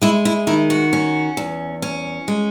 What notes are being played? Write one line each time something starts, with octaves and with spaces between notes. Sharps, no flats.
G#3 E4
E4
D#3 E4
F#4
C#4
E2
C#4
G#3